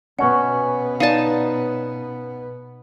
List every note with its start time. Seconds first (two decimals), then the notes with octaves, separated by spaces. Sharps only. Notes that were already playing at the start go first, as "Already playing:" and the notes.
0.19 B2 B3 C#4 F#4 F#5
1.00 D#4 D5 F5 G#5 A5